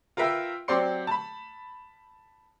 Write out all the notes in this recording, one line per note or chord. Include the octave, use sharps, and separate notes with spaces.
F4 A#4 B4 E5 G5
F#3 C4 G4 D5 C6 C#7
A5 B5